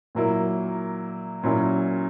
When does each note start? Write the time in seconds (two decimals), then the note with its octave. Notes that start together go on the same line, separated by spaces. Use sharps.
0.15 A#2 F#3 A#3 E4
1.43 A#2 F#3 C#4 E4